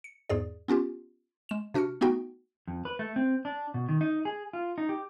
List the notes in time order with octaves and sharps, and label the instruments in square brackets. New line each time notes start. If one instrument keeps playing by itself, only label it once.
[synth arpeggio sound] C#7
E2 G#2 G#4 D5
B3 C#4 F4 G4
G#3 E7
C3 D4 F#4 F6 C#7
A3 B3 D#4 F#4 G5
[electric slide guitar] F2
B4
A3
C4
D4
B2
D#3
D#4
G#4
F4
D#4
G4